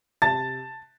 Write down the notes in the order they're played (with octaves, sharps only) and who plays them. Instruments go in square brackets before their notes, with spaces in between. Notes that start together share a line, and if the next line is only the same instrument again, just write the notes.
[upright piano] C3 A5 A6